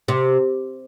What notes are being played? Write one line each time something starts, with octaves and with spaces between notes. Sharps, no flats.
C3